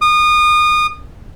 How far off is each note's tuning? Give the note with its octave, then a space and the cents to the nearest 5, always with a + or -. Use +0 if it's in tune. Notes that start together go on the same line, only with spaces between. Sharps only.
D#6 -30